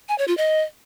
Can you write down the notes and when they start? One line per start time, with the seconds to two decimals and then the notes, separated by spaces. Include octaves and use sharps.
0.09 G#5
0.18 C#5
0.28 F4
0.37 D#5